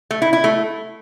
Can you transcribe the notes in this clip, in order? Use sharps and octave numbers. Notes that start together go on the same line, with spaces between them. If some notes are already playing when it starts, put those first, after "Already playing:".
A3
E4
E4
A3